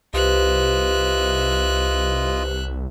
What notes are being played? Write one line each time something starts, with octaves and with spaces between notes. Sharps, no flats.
C2 F4 G4 B4 C5 D#5 E5 F#6